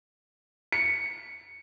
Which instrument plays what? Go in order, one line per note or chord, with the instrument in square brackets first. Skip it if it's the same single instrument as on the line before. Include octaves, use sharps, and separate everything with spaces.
[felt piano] C#7